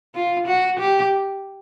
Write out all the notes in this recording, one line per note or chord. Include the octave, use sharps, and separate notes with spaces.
F4
F#4
G4